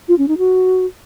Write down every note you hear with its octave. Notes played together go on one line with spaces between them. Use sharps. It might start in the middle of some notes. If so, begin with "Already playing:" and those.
F4
C#4
D#4
F#4